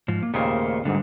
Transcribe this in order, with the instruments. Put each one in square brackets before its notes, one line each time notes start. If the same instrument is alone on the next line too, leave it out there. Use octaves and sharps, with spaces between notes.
[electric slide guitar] G#2 F3
A#3
[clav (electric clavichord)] D#2 A#2 C#3 [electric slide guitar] A3 A#4 C5
[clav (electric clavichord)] D2 G#2 [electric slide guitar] D3 G3